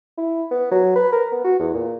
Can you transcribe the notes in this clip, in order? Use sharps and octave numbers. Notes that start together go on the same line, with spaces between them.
E4
B3
F#3
B4
A#4
B3
F#4
E2
A#2